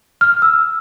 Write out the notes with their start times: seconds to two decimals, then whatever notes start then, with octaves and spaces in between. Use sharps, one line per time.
0.21 F6
0.42 E6